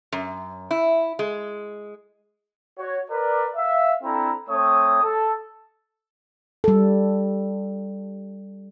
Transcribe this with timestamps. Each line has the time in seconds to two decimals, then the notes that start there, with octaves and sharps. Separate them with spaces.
0.12 F#2
0.71 E4
1.19 G#3
2.79 F#4 C#5
3.11 A#4 B4 D5
3.55 E5 F5
4.03 C4 D4 E4 A4 A#5
4.49 A3 C4 C#5 D#6
5.03 A4 A5
6.64 G3 A4